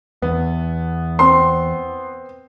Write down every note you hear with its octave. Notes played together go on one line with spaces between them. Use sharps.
E2 B3
C4 C6